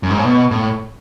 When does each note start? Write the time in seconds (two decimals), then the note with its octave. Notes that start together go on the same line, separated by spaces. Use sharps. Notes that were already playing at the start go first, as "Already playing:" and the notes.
0.03 F#2
0.10 G#2
0.18 A2
0.26 B2
0.51 A2